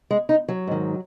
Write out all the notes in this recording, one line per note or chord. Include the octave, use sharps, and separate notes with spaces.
G#3
D#4
F#3
G#2 D#3